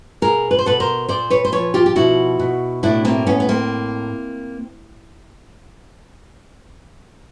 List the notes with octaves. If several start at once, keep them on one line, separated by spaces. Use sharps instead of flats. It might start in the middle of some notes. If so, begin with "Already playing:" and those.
B2 G#4 A#4
B4
C5
B2 A4 B4
A#4 C5
A#2 C5 D5
B4 C#5
C5
F3 B4 C#5
F4 G4
G4
B2 E4 F#4
B2
A2 D4 E4
A#3 C4
A2 B3 C#4
B3
A#3 C4